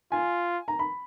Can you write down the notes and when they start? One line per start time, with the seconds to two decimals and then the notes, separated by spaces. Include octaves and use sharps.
0.12 F4 G#5
0.68 A#5
0.79 B5